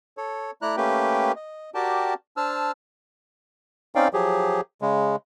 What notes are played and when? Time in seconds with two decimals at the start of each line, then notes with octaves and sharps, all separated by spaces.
0.17 A4 C#5
0.62 A3 E4 D5 A#5 F#6
0.77 A3 A#3 C#4 G4 B4 G5
1.36 D#5
1.74 F#4 G4 A#4 D5 G5 A5
2.37 D4 C5 A5 E6 F6
3.95 C4 C#4 D#4 D5 F5 G5
4.13 F3 F#3 G4 G#4
4.82 C#3 G#3